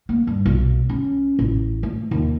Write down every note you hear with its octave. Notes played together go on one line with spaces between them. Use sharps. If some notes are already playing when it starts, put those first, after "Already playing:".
A#3
G2
B1
C#4
A1
A3
D#2